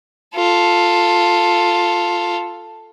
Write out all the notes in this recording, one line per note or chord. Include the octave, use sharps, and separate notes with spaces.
F4 A4